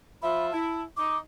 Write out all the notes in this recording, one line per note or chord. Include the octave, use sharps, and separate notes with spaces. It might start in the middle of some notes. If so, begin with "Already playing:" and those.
F3 F4 E5 B5
E4 A5
D#4 D6